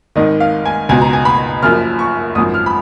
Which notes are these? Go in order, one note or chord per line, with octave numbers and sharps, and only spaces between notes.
G#1 G#2 D#3 D#5
F5
G#5
C#2 B2 G#5
A#5
G#5
B5
F#1 F#2 F3 F6
C#6
G#1 F#2 F3 D#6
F6
B5